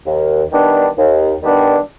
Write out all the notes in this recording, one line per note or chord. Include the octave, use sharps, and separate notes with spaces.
D#2
D#3 G3 B3 D4
D#2
D#3 G3 B3 D4